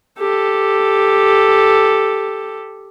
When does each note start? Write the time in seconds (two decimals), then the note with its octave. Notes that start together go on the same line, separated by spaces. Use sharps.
0.19 G4 A4